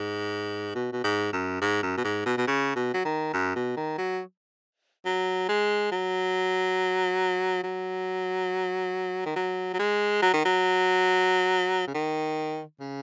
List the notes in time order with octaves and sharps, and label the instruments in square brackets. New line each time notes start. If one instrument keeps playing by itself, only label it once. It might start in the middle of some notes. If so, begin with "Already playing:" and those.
Already playing: [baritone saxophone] G#2
B2
B2
G#2
F#2
G#2
F#2
B2
G#2
B2
B2
C#3
B2
F#3
D#3
F#2
B2
D#3
F#3
F#3
G#3
F#3
F#3
D#3
F#3
F#3
G#3
F#3
D#3
F#3
C#3
D#3
C#3